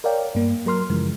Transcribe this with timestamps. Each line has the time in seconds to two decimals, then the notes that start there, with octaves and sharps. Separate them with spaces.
0.04 A#4 C#5 D5 F5 G5
0.35 G2 A#3
0.66 F#3 A#4 C6 F6
0.90 F#2 C#3 E3 F3 G#3